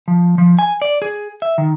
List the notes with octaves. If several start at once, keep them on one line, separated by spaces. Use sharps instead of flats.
F3
F3
G#5
D5
G#4
E5
D#3